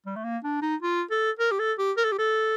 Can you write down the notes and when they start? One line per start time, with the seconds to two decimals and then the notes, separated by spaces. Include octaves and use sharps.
0.06 G3
0.16 A3
0.24 A#3
0.44 D4
0.62 D#4
0.83 F4
1.11 A4
1.39 A#4
1.51 G4
1.59 A4
1.79 G4
1.97 A#4
2.04 A4
2.12 G4
2.19 A4